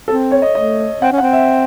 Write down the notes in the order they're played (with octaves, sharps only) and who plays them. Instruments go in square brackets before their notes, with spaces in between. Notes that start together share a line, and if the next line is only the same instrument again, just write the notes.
[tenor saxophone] C4 [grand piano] A4
[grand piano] C#5
D#5
[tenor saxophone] A3 [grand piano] D#5
[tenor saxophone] C4 [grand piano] F#5
[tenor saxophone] C#4
[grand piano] F#5
[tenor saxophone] C4
[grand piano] E5